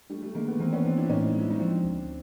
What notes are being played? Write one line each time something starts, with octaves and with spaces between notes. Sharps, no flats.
G3 A3 D4
G3 A3
D#3 G#3 A#3
A3 B3
E3 A#3 C4
B3 C#4
E3 C4 D4
D4 E4
A2 C#4 D#4
G#3
E4
D#4
F3 C4 D4
D2